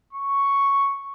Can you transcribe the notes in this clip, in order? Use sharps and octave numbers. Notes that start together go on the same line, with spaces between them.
C#6